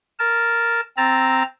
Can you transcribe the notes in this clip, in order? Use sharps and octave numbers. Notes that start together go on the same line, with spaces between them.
A#4 A5
C4 A#5 E6 A6